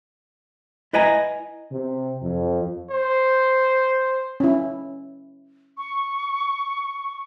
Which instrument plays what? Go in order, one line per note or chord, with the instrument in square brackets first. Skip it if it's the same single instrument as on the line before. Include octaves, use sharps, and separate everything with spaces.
[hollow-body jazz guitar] E4 B4 D#5 G#5 A#5
[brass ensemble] C3
F2
[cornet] C5
[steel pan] C#4 E4
[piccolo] C#6